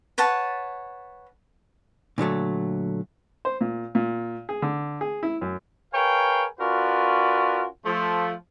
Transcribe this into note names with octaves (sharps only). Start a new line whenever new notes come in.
B4 C#5 F#5 A5
A#2 D3 F#3 A3
C5
A#2
A#2
G#4
D3
G#4
E4
F#2
G#4 A#4 B4 C#5 F5 G5
C#4 F4 F#4 A#4 B4 D5
F3 A3